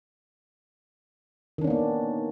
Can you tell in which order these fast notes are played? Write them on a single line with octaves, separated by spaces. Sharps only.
D#3 D4 C#4 B3 A#3